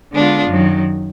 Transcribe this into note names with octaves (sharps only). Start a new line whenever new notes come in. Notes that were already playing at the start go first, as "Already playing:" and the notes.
D3 G#3 B3 D4 F4
F#2 D#3 F#3